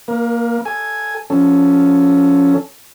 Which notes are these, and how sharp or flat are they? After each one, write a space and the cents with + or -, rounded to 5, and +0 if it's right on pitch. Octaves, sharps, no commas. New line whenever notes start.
A#3 +0 A#4 +35
A4 +0 G#5 +0
F3 +0 C#4 +10 A4 +0